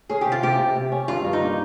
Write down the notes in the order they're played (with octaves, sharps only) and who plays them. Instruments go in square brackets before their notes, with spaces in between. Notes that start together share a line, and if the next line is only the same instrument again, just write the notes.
[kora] C#4 [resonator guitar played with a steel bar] G#4
[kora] C3 [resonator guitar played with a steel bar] G4
[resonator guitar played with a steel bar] F4
[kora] C3 [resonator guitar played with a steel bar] G4
[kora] C3
C3
C#4
[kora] G2 [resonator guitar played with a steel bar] F4
[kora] G2
[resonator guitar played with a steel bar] D#4
[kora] A#3